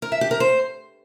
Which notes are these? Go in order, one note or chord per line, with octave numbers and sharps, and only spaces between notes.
A#4
E5
G4
A#4
C5